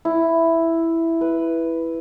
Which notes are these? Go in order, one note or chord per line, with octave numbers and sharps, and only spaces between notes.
E4
B4